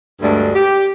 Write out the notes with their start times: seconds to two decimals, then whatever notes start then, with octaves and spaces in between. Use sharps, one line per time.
0.22 D2 G2 G#3 A3 D4
0.55 G4